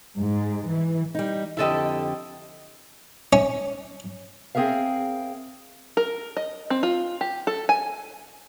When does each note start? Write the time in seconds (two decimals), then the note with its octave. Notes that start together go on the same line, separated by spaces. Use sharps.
0.15 G#2
0.64 E3
1.15 G3 D#4
1.57 F2 D3 E4 G4 A4 D#5
3.33 C#4
4.55 C4 G#4 A#4 E5 F5
5.97 A#4
6.37 D#5
6.70 C4
6.83 F4
7.21 G4
7.47 A4
7.69 G#5